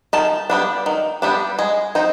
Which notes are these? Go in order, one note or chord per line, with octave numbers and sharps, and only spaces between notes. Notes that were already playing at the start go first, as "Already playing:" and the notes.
D#3 A5
G3 B3 D4
D#3
G3 B3 D4
G#3
C4 D#4